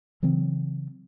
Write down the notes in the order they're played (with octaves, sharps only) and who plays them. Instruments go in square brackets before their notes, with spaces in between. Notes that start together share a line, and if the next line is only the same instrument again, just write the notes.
[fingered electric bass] C#3 E3 F#3 C4